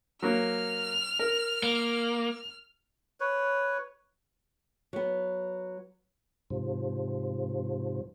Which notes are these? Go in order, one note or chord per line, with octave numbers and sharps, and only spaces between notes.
F#3 A#3 F6
A#4
A#3
B4 C#5
F#3 B3
G#2 C3 F3